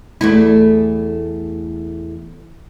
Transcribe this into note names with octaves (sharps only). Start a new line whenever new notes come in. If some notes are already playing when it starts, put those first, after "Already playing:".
E2 A3 E4